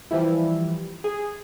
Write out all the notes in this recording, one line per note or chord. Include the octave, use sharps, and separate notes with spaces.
E3 F3 G3 E4
G#4